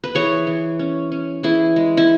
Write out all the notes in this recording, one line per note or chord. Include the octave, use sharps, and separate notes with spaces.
B4
E3 G#4 C#5
E3
C#4
C#4
E3 E4 G#4
G#3
E4